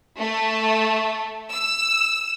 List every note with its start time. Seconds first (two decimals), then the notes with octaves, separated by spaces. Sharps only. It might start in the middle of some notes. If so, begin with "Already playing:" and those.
0.18 A3
1.50 E6